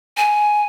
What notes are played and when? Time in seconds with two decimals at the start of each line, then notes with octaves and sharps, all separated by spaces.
0.17 G#5